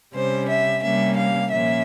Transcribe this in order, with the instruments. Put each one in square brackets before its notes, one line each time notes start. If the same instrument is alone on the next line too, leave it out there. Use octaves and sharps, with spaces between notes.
[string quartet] C3 G3 C#4 C5
E5
C3 G3 A#3 C#4 E5
F5
A#2 F3 A#3 C#4 E5